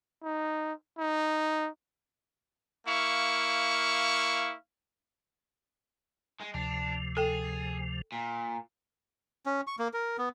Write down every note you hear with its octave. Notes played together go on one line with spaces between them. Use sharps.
D#4
D#4
A#3 E4 F5 C#6
G#3
D2 C3 F3 D4
G#4 A4 G5
A#2
C#4
C#6
A#3
A#4
B3